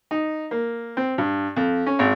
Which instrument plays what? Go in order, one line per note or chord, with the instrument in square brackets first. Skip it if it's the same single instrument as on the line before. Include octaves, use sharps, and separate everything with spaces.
[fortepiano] D#4
A#3
C4
G2
F2
C#4
G#1